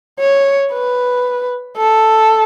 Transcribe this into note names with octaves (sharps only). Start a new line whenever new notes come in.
C#5
B4
A4